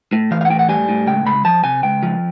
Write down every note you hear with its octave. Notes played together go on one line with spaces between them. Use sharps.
A2
E3 F5
F5
F#5
A2 G5
F#5
G3 G#5
A2
C#2 G5
C#2 B5
F3 A5
C3 G#5
C#2 G5
F3